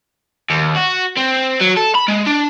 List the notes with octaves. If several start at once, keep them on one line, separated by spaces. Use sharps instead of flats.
D#2
F#4
C4
F#3
A4
B5
G#3
D4